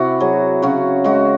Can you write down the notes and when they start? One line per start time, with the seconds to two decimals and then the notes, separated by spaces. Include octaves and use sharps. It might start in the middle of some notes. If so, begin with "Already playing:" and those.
Already playing: C3 E4 F#4
0.20 F#3 G#4
0.62 C#3 F#4
1.04 G#3 F#4